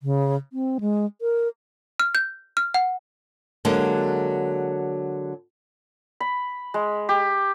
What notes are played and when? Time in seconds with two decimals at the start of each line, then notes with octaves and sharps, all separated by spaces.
0.03 C#3
0.53 C4
0.80 G#3
1.21 A#4
2.00 F6
2.15 G6
2.57 F6
2.74 F#5
3.65 D3 F#3 G#3 A#3
6.20 B5
6.74 G#3
7.09 G4